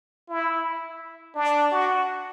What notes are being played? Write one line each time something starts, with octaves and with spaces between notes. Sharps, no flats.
E4
D4
F#4